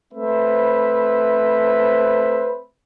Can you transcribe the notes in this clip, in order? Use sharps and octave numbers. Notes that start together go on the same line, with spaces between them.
A3 C4 B4 C5 E5